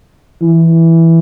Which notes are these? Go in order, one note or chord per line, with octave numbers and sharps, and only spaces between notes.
E3